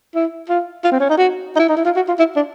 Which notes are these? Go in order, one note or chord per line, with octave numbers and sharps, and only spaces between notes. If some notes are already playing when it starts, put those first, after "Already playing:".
E4
F4
F4
C4
C#4
D#4
F#4
D#4
E4
D#4
E4
F4
F#4
F4
E4
D4